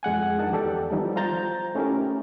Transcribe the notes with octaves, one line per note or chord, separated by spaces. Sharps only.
F2 G#3 F#5 G#5
D4 D#4 A#4 F#5 A5
E2 B3 G4 A4 D5
D#3 F3 G3 B3 D#4 E4
F4 C5 A#5 G6 A6
A3 C#4 D#4 E4 G4 A#4